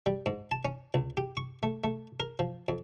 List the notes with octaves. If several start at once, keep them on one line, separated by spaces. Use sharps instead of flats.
G3
G#2
A5
C#4
C#2
G4
C#6
A3
A3
A#4
F3
F2